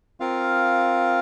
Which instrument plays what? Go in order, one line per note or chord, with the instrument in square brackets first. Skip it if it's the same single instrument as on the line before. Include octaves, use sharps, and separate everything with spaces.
[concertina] C4 F4 A#4 F5